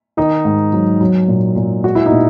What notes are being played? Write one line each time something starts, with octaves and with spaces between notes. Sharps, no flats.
D#3 D#4
G#2
F#3
F#3
A#2
A#2
G#3 F#4
E4
D#4
A#2